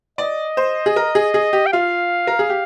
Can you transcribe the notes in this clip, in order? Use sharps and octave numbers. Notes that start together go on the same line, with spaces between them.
D5 D#5
C5
G#4
A#4
G#4
G#4
G4
G5
F4 F5
A#4
G#4
G4